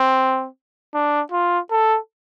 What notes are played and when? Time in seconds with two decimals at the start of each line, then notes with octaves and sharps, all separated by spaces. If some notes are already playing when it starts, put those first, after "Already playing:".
Already playing: C4
0.94 D4
1.32 F4
1.71 A4